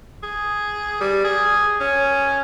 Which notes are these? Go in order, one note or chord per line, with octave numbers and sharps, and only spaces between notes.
G#4
G3
G#4
C#4